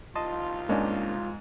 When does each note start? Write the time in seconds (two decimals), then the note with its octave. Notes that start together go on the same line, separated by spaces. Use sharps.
0.15 C2 D#4 F4 D#5 A5 C6
0.69 G#2 A#3 C#4 D4